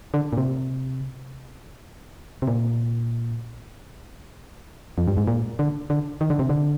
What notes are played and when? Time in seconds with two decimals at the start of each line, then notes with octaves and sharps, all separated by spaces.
0.14 D3
0.33 A#2
0.38 C3
2.42 C3
2.47 A#2
4.98 F2
5.08 G2
5.17 G#2
5.28 A#2
5.59 D3
5.90 D3
6.21 D#3
6.30 D3
6.39 C3
6.49 D3